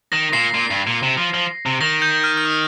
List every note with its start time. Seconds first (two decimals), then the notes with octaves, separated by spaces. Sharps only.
0.12 D#3 A#6
0.33 A#2 C7
0.54 A#2
0.71 G2
0.87 A#2
1.03 C3
1.17 F3
1.34 F3
1.66 C3
1.81 D#3 A#6
2.02 G6
2.24 F6
2.37 F6
2.45 D#6